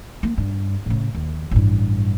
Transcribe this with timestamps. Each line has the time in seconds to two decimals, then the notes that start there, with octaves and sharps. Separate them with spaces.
0.23 A#3
0.38 G2
0.86 A2 C#3
1.15 D#2
1.51 A1 G2